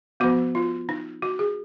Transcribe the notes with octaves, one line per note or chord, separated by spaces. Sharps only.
F3 B3 F#4
F4
D#4
F#4
G#4